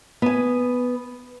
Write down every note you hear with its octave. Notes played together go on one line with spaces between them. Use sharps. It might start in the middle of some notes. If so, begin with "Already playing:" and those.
B3 G#5